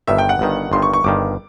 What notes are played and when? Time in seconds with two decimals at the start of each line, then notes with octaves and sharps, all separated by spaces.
0.07 G1 G2 D#3 E5
0.18 G5
0.29 F#5
0.39 G1 G2 D#3
0.72 G1 G2 D#3 C6
0.82 C#6
0.94 C#6
1.04 G1 G2 D#3 D6